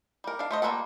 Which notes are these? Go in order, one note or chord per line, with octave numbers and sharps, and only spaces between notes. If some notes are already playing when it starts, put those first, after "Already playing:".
G3 A#4
D4 F5
A3 C5 D#5
G3 A#3 F4 A4 F#5